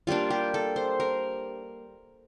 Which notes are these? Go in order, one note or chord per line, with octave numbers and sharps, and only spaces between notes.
G3 A#3 D4 F4
G4
A4
C5
A#4